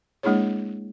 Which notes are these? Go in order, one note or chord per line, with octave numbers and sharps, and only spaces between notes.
G#3 A#3 D4 E4 G#4 C#5